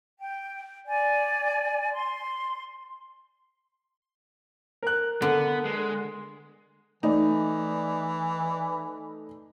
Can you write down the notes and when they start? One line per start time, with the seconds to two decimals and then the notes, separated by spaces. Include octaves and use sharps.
0.18 G5
0.87 D5 G#5
1.92 C6
4.83 A#4 F#6
5.22 D3 B3
5.65 G#3
7.03 E3 A3 D#4 D5